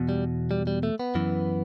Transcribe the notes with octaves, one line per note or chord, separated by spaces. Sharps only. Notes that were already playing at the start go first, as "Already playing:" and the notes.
Already playing: E2 B2
G3
G3
G3
A3
B3
F#2 E3